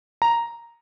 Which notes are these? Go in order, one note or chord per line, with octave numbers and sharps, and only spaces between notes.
A#5